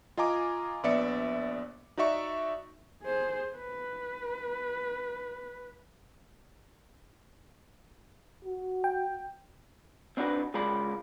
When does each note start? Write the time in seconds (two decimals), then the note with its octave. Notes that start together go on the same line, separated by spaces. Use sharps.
0.17 F4 D#5 G#5 A#5 D6
0.83 A#1 B3 D5 E5 C#7
1.97 D#4 F#4 D5 E5 C#6
3.02 G#4 C5
3.57 B4
8.45 F#4
8.84 G5
10.17 C4 D4 D#4 F#4 B4
10.54 C#3 G#3 F4 A#4 D5 B5